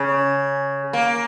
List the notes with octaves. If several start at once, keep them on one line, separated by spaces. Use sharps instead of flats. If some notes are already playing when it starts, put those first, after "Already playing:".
Already playing: C#3
A#3